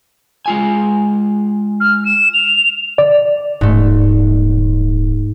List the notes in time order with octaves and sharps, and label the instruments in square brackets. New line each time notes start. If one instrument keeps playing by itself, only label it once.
[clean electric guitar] G#3 F4 G#5
[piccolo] F6
E7
F7
[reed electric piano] D5
[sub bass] D#1 [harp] G#2 A3